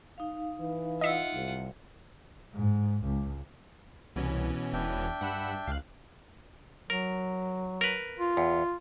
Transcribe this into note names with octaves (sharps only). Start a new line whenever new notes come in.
D#4 F5
E3 B4
F4 D#5 E5 F#5
C2
G#2
C#2
C2 B2 E3 C#4
E1 D4 E5 G5
G2 F#5 B5 E6
C#2 F5 F#6
F#3 A#4
A#4 B4
F4
E2